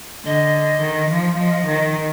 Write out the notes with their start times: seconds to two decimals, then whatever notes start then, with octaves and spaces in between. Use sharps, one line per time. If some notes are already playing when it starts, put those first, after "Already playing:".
0.25 D3 D#5
0.81 D#3
1.10 F3
1.38 F3 D#5
1.66 D#3